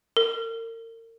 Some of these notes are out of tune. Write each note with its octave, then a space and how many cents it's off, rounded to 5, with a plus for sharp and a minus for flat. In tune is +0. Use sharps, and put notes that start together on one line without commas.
A#4 -35